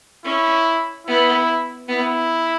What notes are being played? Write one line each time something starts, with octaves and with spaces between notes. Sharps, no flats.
C#4 E4
B3 E4
B3 E4